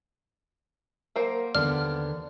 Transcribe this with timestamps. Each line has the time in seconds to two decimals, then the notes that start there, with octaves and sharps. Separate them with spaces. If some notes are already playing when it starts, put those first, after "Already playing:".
1.16 F#3 A#3 C5
1.55 D#2 D3 B3 D5 F6